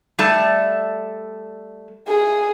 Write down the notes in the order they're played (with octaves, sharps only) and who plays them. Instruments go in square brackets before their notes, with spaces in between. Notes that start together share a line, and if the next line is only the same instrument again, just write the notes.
[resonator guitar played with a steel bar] G3 A3 A4
[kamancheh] G#4